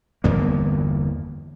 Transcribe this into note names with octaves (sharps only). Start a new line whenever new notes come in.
G1 E2 A#3